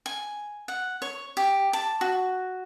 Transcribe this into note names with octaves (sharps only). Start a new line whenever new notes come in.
G#5
F#5
C#5
G4
A5
F#4